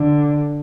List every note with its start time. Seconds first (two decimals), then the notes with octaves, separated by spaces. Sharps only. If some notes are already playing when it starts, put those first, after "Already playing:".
Already playing: D3